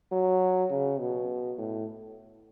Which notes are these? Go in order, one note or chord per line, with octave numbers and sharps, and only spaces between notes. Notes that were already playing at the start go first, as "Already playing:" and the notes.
F#3
C#3
B2
A2